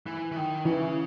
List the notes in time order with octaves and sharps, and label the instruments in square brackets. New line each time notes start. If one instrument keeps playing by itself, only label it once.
[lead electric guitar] E3
E3
D#3
[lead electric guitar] C#3 [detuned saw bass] E3